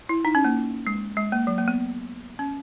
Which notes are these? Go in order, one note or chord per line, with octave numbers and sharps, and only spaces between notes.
E4
D#4
C#4
A#3
G#3
G#3
A#3
F#3
A#3
B3
C#4